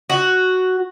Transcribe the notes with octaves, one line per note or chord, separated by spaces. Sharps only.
F#4